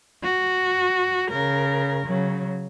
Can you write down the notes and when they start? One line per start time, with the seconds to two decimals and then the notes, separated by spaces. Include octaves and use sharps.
0.23 F#4
1.30 C#3 A#4
2.07 C#3 F#3